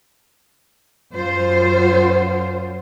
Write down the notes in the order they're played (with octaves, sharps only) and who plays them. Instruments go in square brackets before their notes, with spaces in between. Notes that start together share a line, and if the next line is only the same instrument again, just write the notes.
[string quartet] F#2 [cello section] F4 C5